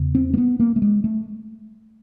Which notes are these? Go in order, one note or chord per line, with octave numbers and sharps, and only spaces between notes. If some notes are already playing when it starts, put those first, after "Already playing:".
Already playing: E2 C#3
C4
A#3
B3
A#3
A3
G#3
A3